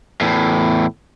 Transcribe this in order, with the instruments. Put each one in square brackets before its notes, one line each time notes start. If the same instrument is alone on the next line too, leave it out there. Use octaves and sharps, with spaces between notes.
[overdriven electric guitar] E2 A2